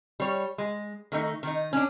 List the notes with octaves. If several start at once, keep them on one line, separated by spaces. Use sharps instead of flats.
G3 C#5
G#3
D#3 A3 D#4
D#3 D#4
C#4 D4